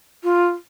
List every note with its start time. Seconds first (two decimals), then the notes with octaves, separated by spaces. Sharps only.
0.24 F4